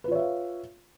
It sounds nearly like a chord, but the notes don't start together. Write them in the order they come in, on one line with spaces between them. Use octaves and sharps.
B4 F4 C#5 E5 F5